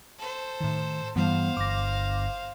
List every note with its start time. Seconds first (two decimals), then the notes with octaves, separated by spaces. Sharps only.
0.18 A4 C5
0.61 A2 D#3
1.16 G2 E3 G3 B3 C5 F5
1.57 G1 D6 A#6